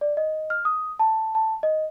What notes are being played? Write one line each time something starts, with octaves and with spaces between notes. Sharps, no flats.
D5
D#5
F6
D#6
A5
A5
D#5